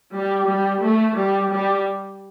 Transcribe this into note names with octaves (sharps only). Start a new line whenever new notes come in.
G3
G3
A3
G3
G3